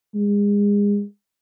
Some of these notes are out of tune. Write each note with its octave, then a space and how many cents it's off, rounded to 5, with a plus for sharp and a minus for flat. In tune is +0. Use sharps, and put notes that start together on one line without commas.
G#3 -30